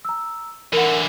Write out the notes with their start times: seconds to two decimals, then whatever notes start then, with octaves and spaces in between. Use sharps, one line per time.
0.05 A#5 E6
0.73 D3 E3 A#4 F#5